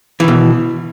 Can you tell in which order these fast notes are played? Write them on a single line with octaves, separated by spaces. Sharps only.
E3 D#3 B2